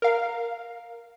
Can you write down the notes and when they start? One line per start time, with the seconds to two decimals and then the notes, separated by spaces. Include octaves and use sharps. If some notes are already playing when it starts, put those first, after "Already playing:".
0.02 A#4 F5